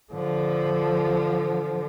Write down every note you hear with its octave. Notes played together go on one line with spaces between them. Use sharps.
D3 F3